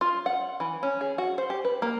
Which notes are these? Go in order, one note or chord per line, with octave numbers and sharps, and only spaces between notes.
F4
F#5
E3
C#4
G#4
F#4
C5
G4
B4
A#3